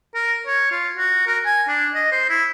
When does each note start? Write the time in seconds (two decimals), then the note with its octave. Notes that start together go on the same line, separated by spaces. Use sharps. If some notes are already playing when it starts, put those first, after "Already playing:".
0.15 A#4
0.47 C#5
0.72 F4
0.98 F#4
1.27 A#4
1.46 G#5
1.68 D4
1.95 D#5
2.12 C5
2.29 E4